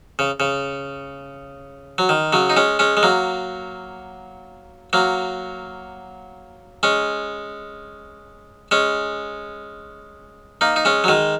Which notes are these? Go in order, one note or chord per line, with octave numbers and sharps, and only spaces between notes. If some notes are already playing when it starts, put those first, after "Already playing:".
C#3
C#3
F#3
D#3
C#3 F#3
D#4
G#3 C#4
G#3 C#4
G#3
F#3 A#3
F#3 A#3
G#3 C#4
G#3 C#4
A#3 D#4
D#4
G#3 C#4
F#3
D#3 G#3